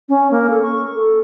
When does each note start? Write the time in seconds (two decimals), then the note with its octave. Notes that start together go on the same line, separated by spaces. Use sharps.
0.09 C#4
0.31 A#3
0.50 A4
0.62 C#6
0.94 A4